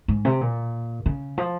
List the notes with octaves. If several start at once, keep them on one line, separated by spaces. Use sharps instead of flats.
G#2
C3
A#2
C#3
F3